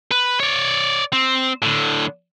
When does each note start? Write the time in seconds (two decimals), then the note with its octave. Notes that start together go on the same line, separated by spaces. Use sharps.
0.11 B4
0.40 C#5 D5
1.13 C4
1.62 A2 D3